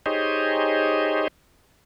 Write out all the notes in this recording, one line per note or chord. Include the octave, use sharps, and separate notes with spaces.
D#4 G4 G#4 C5 C#5 D#5